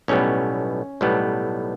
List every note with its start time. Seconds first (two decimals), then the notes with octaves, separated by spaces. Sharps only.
0.08 B1 A2 G3 B3 C#4
1.01 B1 A2 G3 B3